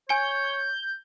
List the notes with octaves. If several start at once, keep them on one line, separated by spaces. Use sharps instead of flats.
C#5 G#5 G6 C#7